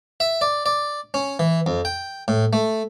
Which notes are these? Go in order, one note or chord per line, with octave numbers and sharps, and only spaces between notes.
E5
D5
D5
C#4
E3
F2
G5
A2
A3